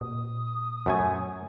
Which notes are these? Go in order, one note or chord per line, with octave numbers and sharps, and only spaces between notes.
A#2 D#6
F#2 A3 G#5